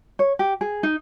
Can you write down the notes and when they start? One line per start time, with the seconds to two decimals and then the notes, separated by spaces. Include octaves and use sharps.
0.19 C#5
0.39 G4
0.61 G#4
0.83 D#4